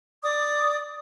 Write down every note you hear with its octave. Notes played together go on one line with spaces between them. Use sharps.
D5 D6 D#6